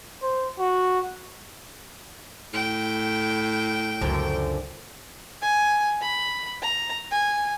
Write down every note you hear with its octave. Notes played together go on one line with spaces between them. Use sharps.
C5
F#4
A2 G5
C#2 F#2 D3 F3
G#5
B5
A#5
G#5